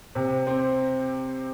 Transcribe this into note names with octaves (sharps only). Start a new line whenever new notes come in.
C3
C4